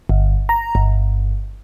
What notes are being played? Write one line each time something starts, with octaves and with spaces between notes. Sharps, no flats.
G1
A#5
G1